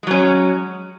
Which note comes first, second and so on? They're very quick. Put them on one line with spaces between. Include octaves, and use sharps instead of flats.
G#3 F#3 C#4